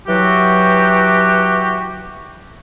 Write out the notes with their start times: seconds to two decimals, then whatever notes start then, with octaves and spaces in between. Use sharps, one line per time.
0.08 E3 F#3 F#4 G4